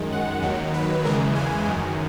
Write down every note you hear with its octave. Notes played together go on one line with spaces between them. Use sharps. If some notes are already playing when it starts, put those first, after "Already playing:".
Already playing: F#2 D#3 G#3
F#5
D#2 D#3 F#3
B4
E2 C#3 E3 G#3 A#4
G#5
F#2 D#3 F#3